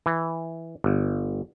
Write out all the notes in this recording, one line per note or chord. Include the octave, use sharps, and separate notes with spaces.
E3
G1